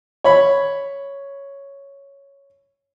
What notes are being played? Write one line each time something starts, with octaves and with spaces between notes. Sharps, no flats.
C#5 B5